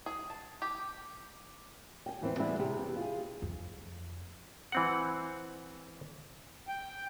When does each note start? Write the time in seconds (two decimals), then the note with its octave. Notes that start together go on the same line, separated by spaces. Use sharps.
0.06 G#4
0.30 A5
0.62 G4
2.06 G5 G#5
2.21 E2 E3 C4
2.39 E3 G3 G#3 B3 D4 E4
2.59 C3 G4 G#4
2.79 E2
2.96 F4 G#4
3.42 F2
4.72 E3 C4 F#5
6.69 G5